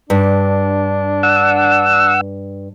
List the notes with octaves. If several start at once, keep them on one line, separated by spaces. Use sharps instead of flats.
G2 D4
F#5 E6